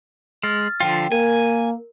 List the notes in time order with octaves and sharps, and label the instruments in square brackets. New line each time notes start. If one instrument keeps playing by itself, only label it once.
[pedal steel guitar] G#3 [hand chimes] F6 A6
[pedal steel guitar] D3 F3 F4 [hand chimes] G5
[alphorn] A#3 [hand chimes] A#4 [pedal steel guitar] G#5